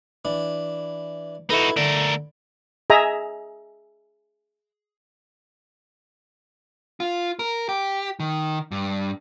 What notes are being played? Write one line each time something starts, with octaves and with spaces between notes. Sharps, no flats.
E3 D4
D#4 E4 F#4 A4 B4
D3 A3 A#4
G#4 D#5 E5 G#5 A#5
F4
A#4
G4
D#3
G2